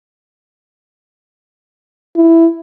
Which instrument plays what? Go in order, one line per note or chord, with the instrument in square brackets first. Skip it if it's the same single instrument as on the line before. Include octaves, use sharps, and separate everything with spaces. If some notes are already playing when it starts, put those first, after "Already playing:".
[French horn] E4